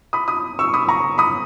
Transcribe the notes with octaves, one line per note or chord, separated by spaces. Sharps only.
B5 D#6
B5 D#6
C#6 E6
B5 D#6
A#5 C#6
B5 D#6